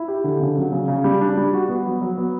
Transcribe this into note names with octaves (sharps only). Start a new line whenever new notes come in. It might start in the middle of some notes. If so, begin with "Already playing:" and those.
Already playing: E4
G4
D3
C#3
F#3
C#3
C#3
G3
D4
G3
F#4
B3
F#3
F#3
B3